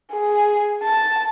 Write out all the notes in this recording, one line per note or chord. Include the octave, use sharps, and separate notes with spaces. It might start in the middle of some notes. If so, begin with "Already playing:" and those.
G#4
A5